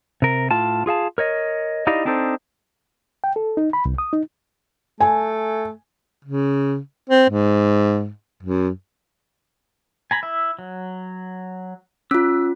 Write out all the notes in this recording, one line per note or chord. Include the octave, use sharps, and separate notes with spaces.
C3 A#4
A2 F4 A5
F4 G#4 F5 A5
A#4 C#5 D#5
D#4 E4 G4 D5 D#5 F5
C4 D4 D#4 A4 C5
G5
A4
D#4
B5
C2
D#6
D#4
A3 G#5
C#3
C4
G#2
F#2
G#5 A#5 B5
E4 E5
F#3
C#4 F4 E6